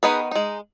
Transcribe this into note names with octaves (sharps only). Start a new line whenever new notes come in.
D#3 F#3 B3 D#4 G#4 B4
G#3 D#4